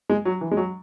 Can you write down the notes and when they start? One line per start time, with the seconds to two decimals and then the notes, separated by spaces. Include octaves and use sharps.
0.09 G#3
0.25 F#3
0.41 E3
0.51 G#3
0.57 F#3